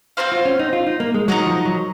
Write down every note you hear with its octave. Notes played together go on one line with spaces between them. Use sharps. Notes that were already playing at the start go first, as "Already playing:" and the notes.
C4 F#4 C5 F5
F4
C#4
D#4
F4
D#4
A#3
G#3
F#3 D#4 A#4 D#5 F#5
F3
F#3